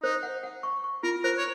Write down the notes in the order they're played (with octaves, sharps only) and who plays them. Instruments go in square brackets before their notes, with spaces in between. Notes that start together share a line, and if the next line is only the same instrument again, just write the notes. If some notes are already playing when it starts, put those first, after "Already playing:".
[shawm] D#4 [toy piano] C5
[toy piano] F#5
F#5
C#6
C#6
[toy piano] F4 [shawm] A#4
[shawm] A#4 [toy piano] C5
[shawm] C#5